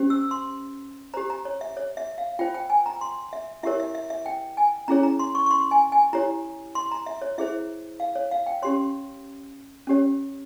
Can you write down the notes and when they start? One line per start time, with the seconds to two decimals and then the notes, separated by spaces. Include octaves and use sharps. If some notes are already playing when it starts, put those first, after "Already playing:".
Already playing: C#4 G4 C5
0.10 E6
0.31 C6
1.14 G4 C5 A#5
1.30 A#5
1.45 C#5
1.61 E5
1.77 C#5
1.97 E5
2.18 F5
2.39 F4 C5 G5
2.54 G5
2.70 G#5
2.86 A#5
3.01 C6
3.33 E5
3.63 E4 G4 A#4 C#5 E5
3.80 E5
3.95 E5
4.10 E5
4.26 G5
4.57 G#5
4.88 C#4 E4 G#4 C#5 A#5
5.03 A#5
5.19 C6
5.35 C#6
5.46 C#6
5.51 C6
5.71 G#5
5.92 G#5
6.13 E4 G4 C#5 A#5
6.75 C6
6.91 A#5
7.06 E5
7.22 C#5
7.38 E4 G#4 C5 E5
8.00 F5
8.15 C#5
8.31 F5
8.46 G5
8.62 C#4 G4 C#5 C6
9.87 C#4 G4 C#5